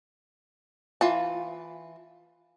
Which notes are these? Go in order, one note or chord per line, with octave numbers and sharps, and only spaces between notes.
E3 F4 A5